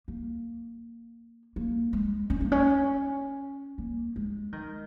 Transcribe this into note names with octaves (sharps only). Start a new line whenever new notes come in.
A#3
A#3
G#3
C#4
A#3
C#4
A#3
G#3
D#3